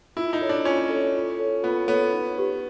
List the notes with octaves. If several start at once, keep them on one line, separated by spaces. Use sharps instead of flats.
E4 F4
D#4
A4 C#5
D4
C#4 F4
A4 C#5
F4
A4 C#5
B3 F4
B3 A4 C#5
D#4
G4 B4